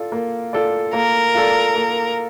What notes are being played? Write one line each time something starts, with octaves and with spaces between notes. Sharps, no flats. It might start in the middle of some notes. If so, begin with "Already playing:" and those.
Already playing: F4 A4 D5
A#3
F4 A4 D5
A#3 A#4
F4 A4 D5
A#3